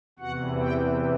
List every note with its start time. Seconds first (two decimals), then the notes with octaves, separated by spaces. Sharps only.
0.19 E2 C3 E3 F#4 F#5
0.60 G4 G5